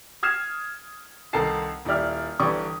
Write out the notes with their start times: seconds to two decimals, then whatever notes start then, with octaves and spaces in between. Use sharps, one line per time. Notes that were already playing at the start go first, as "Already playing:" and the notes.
0.23 D#6 F6 G#6 C7 E7
1.33 C2 D#3 A4 A#4 A5 C7
1.85 D#1 E4 G4 D5 F6
2.39 G1 E3 G4 D5 C#6 D#6